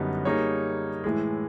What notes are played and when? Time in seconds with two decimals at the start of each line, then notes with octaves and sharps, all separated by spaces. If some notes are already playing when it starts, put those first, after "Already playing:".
Already playing: F#2 D3 G3 B3 D#4
0.25 G3 A#3 D#4 G#4 C#5
1.04 A2 E3 G#3